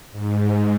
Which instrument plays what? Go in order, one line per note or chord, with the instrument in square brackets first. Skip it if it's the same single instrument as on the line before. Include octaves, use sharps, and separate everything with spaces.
[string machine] G#2